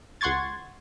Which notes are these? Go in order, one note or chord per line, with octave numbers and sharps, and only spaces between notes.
C#2 F#5 C6 C#6 G#6 A6